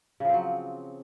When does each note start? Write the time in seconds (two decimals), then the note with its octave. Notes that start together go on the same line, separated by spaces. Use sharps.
0.20 C#3
0.25 F3
0.29 C4
0.34 F#3